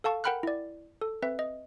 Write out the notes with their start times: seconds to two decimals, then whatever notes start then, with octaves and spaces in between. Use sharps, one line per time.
0.04 A4 F5 A5 C#6
0.24 A#4 F#5 G5 B5 F6 F#6
0.43 E4 D5
1.01 A4
1.22 C4 B4 E5
1.39 D#5